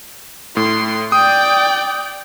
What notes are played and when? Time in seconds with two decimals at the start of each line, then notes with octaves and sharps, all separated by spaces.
0.57 A2 C6
1.12 D5 G5 D#6